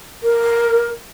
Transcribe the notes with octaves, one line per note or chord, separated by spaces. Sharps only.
A#4